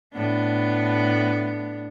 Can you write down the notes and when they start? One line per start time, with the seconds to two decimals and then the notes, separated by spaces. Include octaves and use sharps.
0.14 A2 B3 D4